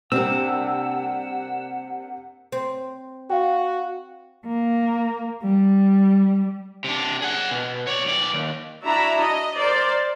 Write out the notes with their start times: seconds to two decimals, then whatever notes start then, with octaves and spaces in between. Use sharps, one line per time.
0.12 C3 G3 A#3 C4 D4 F#5 E6
2.52 C4
3.30 F#4 F5 G5
4.46 A#3
5.43 G3
6.84 C3 D4
7.22 G#4 F#5
7.51 B2
7.87 C#5 D5
8.05 B1 D5
8.34 D#2
8.83 D4 E4 F#4 E5 A#5 B5
9.22 D#5
9.57 A#4 C5 D5